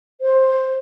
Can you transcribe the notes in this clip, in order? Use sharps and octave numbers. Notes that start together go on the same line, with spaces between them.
C5